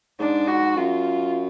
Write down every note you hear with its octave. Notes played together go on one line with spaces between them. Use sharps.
G#2 D4
F#4
F#2 F4